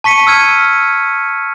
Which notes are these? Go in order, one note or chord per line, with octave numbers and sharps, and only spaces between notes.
A5 C#6 B6 C#7 D#7
E6 F6 G#6 D#7